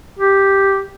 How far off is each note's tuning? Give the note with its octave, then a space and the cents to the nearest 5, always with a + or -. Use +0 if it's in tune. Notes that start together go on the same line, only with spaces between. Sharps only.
G4 +0